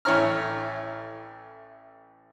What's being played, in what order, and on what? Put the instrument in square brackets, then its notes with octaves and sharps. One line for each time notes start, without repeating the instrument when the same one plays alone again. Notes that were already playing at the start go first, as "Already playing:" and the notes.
[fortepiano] A1 A2 E4 C#5 A#5 F6